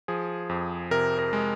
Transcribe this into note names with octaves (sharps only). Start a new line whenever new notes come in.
F3 G#4
F2
C3 A#4
A#4
G#3